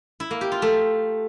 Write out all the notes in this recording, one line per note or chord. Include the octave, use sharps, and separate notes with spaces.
E4
A#3
G4
F4
A3